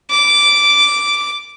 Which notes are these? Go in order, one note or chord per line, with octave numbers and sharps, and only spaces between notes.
D6